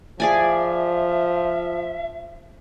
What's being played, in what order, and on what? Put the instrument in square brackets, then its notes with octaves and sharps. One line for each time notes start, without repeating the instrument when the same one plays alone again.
[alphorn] F3 [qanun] G#4 D5 G#5 [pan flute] E5